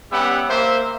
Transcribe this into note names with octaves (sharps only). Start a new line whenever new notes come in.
G3 B3 C#4 G4 E5 F#5
A#3 C5 E5